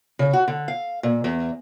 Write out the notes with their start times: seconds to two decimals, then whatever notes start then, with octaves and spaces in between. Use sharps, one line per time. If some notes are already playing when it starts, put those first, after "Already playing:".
0.19 C#3
0.33 F#4
0.48 D3
0.68 F5
1.03 A#2
1.24 E2